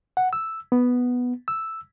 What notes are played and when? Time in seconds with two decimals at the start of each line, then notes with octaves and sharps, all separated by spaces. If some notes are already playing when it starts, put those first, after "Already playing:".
0.17 F#5
0.33 E6
0.72 B3
1.48 E6